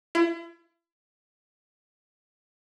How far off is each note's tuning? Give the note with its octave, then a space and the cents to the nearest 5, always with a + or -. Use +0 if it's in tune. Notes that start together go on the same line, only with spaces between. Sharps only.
E4 +40